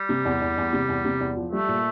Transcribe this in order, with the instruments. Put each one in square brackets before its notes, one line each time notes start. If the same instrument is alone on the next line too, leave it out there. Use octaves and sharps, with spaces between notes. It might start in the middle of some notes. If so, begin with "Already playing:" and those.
Already playing: [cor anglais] G3
[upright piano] C3
E2
E2
E2
C3
E2
C3
E2
F3
[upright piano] G3 [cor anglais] A3
[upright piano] A#2